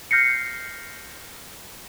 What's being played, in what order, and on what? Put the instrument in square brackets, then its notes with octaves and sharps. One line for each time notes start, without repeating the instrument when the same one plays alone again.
[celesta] F6 G6 A#6 C7 C#7